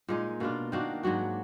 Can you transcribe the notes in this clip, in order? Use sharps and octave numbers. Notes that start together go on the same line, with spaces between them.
A#2 G#3 D#4
B2 A#3 D4 F4
D#3 A#3 D4 F#4
G#2 F#3 D4 F#4